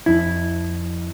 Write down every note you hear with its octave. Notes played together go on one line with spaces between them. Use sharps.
F2 E4